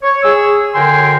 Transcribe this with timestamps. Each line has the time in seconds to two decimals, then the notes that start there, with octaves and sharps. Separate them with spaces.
0.02 C#5
0.23 G#4 E6
0.75 F#2 D3 A#4 G5 G#5 C6